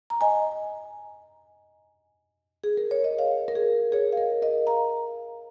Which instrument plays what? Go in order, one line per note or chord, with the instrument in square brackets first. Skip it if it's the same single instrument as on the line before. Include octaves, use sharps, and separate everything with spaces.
[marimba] A#5
D#5 G#5
G#4
A#4
C#5
D#5
C#5 F5
A#4
G#4
G#4 C#5
F5
A#4 D#5
A#4 D#5
F5 A#5